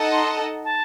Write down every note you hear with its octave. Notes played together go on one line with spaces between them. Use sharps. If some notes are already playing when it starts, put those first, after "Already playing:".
Already playing: D#4 A4 D#5 F#5 A5
C6
A5